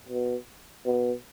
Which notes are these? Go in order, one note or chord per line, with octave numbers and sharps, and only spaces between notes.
B2
B2